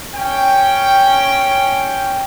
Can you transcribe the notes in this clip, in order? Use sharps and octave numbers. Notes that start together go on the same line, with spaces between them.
C#4 G5